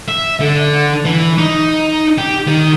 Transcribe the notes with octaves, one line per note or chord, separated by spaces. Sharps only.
E5
D3
E3
D#4
G4
D#3